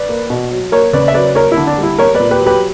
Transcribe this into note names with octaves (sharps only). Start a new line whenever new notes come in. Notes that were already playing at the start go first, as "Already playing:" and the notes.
Already playing: B4 D5
A#3
B2
F#3
A#3 A#4 C#5
C#3 B4 D5
E5
F#3 B4 D5
A#3 A#4 C#5
D3 E4
D4
G3
E4
A#3 A#4 C#5
A#2 B4 D5
G4 B4
F#3
G4 B4